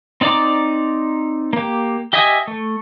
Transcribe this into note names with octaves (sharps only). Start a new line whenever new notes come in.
C4 D#4 D5 A#5 D6
A#3 G4
G4 D#5 E5 G#5 D#6
A3